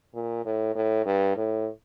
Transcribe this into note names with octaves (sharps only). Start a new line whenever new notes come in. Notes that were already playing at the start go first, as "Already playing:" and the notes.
A#2
A2
A2
G2
A2